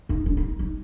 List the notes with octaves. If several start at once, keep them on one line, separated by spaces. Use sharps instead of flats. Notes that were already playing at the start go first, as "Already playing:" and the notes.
D#4
D4
D#4
D#4